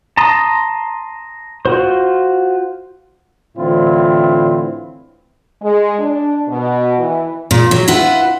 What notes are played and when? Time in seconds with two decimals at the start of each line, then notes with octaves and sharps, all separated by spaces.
0.17 A5 A#5 C6 D#6
1.66 F4 F#4 C5
3.57 A2 D3 E3 C4 E4 F4
5.62 G#3
5.99 D4
6.48 B2
6.98 E3
7.51 A#2
7.71 F#3
7.88 E4 F4 B4 F#5